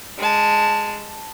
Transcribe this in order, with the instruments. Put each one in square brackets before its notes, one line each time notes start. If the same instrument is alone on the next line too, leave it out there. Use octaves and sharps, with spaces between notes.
[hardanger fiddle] G#3 A5